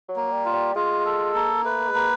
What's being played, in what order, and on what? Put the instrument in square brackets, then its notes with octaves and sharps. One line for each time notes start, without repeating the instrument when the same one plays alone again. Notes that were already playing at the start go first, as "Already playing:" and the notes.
[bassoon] F#3
[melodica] A#3
[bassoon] G3
[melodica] F4
[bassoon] G3
[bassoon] G#3 [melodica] F4
[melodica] A4
A#3
[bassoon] A3 [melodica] B4
[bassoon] G#3
[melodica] A#3